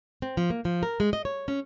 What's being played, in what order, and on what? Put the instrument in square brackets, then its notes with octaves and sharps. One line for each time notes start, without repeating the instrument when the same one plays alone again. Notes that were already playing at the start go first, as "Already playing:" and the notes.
[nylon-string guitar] C4
F3
A#3
F3
A#4
G#3
D#5
C#5
C#4